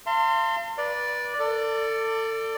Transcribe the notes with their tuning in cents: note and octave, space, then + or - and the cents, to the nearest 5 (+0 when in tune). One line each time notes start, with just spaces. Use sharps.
F5 -35 A5 +45 C6 +0
B4 -30 D5 +0
A4 +30 D5 +0